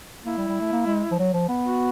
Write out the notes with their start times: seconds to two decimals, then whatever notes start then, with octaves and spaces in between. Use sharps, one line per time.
0.25 A#3 E4
0.37 G3
0.48 G3
0.60 A3
0.72 A#3
0.87 G#3
1.11 F3
1.19 F#3
1.33 F3
1.49 B3
1.65 F#4